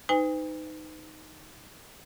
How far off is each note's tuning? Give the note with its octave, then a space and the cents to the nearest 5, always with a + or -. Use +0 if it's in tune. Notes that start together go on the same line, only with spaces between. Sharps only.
D#4 +0 B4 +45 G#5 -45